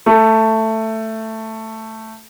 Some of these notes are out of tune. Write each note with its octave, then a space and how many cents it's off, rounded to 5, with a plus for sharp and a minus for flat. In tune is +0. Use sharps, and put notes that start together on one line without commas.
A3 +10